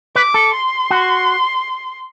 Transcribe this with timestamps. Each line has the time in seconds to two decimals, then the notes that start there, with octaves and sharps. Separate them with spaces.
0.16 B4 D6
0.34 A4
0.53 C6
0.91 F#4